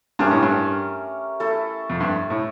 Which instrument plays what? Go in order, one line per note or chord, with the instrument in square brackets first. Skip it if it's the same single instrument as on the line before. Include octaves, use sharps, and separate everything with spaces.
[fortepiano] G2 [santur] A3 C#4 G4 A#4
[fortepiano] A2
G2
[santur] A3 E4 A4 E5
[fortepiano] F2
G2
A2